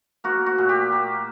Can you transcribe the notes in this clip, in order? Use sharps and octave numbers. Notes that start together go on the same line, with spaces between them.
A#3 F#4
F#4
A#2
G4
A#3